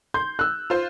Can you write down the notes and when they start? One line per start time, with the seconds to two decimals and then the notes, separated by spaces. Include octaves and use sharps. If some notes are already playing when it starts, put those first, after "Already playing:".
0.14 C6 G6
0.39 E6 F#6
0.70 F4 C5